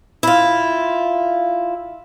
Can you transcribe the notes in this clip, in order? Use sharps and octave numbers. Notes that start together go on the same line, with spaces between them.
E4 F4